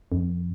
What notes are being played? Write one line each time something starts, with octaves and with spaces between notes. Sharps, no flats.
F2